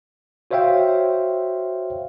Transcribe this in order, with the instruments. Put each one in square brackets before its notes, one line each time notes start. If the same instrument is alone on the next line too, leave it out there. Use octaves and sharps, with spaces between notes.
[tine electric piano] F#4 C5 C#5 E5 F5 G5